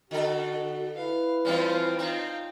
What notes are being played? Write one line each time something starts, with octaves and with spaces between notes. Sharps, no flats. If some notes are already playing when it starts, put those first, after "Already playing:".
D3 F#4 A4
E4 B4 F5
E3 G3 C4 C#4 F4
C4 D#4 F4